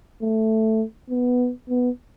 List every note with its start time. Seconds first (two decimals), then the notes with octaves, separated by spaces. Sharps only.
0.22 A3
1.10 B3
1.69 B3